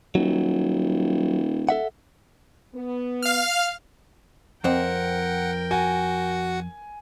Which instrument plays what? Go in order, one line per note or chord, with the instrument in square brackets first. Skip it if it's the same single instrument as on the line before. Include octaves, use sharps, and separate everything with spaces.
[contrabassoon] D#1 [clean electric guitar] F#3
[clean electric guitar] A4 E5 F#5
[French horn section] B3
[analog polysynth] F5 F6
[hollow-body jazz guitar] F2 C4 [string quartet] A#4 G5 [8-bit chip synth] F#5
[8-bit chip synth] F#4 F#5 [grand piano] G#5